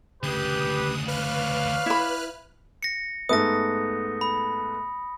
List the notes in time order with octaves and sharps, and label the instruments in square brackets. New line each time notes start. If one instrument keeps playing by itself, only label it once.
[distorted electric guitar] D2 C#3 [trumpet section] G4 B4 [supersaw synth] D#6
[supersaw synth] B4 F6 F#6 [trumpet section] C#5 D5 F5
[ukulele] E4 B5
[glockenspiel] A#6 C#7
[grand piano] G#2 A3 B3 [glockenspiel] D#6 A#6
[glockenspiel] B5